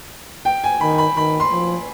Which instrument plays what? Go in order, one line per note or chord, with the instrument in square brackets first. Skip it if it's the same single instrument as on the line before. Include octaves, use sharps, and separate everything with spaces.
[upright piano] G5
G#5
[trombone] D#3 [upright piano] B5
[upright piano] B5
[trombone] D#3 [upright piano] B5
[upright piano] C6
[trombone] F3